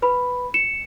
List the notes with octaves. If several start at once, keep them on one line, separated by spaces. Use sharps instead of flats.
B4 B5
C#7 E7